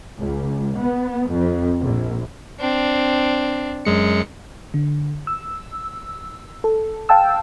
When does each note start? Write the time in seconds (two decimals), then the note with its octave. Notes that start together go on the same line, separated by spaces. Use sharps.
0.18 C#2
0.78 B3
1.31 F2
1.81 A#1
2.60 C4 D4
3.85 F#2 G#3 C#7
4.74 D3
5.27 E6
6.64 A4
7.09 F5 G5 A5 E6